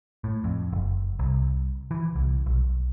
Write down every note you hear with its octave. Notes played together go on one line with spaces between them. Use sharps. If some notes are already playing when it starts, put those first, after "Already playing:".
A2
F2
F#1
C2
E3
C2
B1